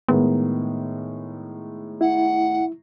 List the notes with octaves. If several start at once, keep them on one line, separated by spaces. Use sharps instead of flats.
A2 D#3 G#3 B3
E4 F#5